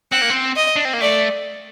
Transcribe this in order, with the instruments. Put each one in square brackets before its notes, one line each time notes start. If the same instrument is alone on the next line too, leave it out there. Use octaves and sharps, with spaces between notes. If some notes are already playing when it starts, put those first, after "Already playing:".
[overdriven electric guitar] C4 [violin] F#5
[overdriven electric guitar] A#3
C4
[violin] D#5
[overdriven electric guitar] D4
C4
A#3
[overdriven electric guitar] A3 [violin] D5